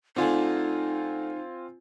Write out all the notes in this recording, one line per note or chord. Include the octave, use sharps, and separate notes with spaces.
D3 A3 C4 D#4 F4 G#5